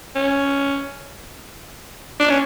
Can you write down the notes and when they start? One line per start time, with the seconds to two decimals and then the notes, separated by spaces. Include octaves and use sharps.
0.16 C#4
2.20 D4
2.30 C#4